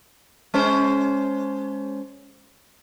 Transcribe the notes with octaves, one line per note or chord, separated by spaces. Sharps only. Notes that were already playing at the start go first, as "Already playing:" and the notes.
G#3 C#4 C5